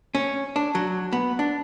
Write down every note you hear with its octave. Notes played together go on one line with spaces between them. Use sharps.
C#4
D4
F#3
B3
D4